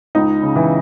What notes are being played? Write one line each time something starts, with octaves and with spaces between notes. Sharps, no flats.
C#2 D#4 D#5
C#3
E3 E4